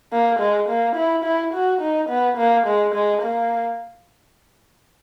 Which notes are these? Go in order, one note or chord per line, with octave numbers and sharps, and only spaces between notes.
A#3
G#3
A#3
E4
E4
F#4
D#4
B3
A#3
G#3
G#3
A#3